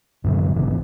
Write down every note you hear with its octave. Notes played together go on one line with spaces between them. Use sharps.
F#2 A#2 D3 F#3
G#1 G2 C#3 E3